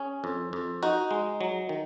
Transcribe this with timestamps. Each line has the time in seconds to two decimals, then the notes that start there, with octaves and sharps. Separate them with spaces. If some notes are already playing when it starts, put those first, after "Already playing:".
Already playing: C#4 G#4
0.24 F2
0.53 F2
0.83 D#4 F#4
1.11 G#3
1.41 F#3
1.69 D#3